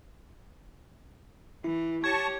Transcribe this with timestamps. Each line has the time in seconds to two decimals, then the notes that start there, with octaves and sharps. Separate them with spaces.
1.64 E3 E4
2.04 G4 C#5 A5 C#6 G#6